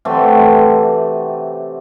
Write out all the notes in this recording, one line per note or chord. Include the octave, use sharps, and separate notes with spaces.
C3 E3 F#3 A3